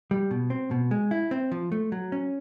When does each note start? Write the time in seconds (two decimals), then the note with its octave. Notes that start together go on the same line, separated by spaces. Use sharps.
0.11 G3
0.31 B2
0.50 C4
0.71 B2
0.91 G#3
1.11 E4
1.31 C4
1.52 F3
1.72 A3
1.92 F#3
2.12 C#4